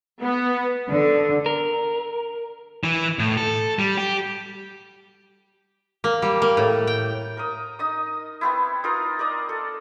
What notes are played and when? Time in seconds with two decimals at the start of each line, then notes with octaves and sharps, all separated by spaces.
0.21 B3
0.89 D3
1.46 A#4
2.84 E3
3.19 A2
3.37 A4
3.79 G3
3.97 G4
6.04 A#3
6.22 G3
6.42 A#3
6.57 A2
6.87 G5
7.37 A#4 D#6
7.79 D#4 D#5 D#6
8.41 B3 C4 E4
8.84 D#4 F4 A#4 D#5
9.19 A#4 D5 D#5
9.49 A4